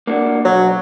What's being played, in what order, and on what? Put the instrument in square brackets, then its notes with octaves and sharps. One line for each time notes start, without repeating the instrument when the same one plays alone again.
[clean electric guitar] A#3 D4 F#4
[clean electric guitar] B1 [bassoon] F#3